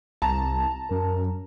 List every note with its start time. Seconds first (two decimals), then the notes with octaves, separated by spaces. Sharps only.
0.22 C2 A5 A#5
0.91 F#2 A#4